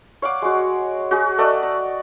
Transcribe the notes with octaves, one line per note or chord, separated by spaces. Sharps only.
C#5 F5 F#5 D6
G#3 F#4
F#4 G#4
A3 A4 D5 D#5
A#5